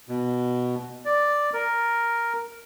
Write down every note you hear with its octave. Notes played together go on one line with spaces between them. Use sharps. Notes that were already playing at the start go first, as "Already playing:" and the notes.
B2
D5
A#4